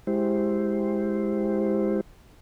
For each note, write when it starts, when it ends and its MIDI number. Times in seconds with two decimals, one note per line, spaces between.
0.07 2.01 56
0.07 2.01 64
0.07 2.01 67
0.07 2.01 72